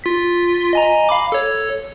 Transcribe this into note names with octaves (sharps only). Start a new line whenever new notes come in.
F4 B6
D#5 G#5 A#5
F5 B5 D6
A4 C#5